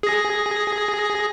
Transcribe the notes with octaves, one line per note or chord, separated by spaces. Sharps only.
G#4 A#6